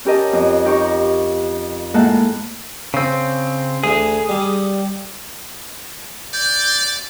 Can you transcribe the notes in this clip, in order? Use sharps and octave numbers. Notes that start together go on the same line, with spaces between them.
C#4 G4 A#4 D#5 A5
F2
D#4 G4 A#4 C#6
A2 G#3 A#3 F#5 A5
C#3 C4
D2 G#4
G3
D5 G6